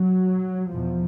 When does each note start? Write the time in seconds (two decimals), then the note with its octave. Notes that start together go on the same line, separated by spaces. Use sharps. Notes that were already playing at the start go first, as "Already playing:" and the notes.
Already playing: F#3
0.71 E2 B2 F3